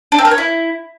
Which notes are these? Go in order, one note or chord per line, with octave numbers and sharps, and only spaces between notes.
D4
C4
A#4
C#5
E4